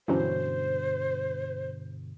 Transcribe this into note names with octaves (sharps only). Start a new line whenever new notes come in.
G2 B2 D3 E3 F#3 C#4 C5